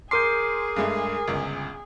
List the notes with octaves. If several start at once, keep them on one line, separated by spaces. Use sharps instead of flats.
G#4 A#4 C6 D6 G6 C7
G2 G#3 A3
G1 C#2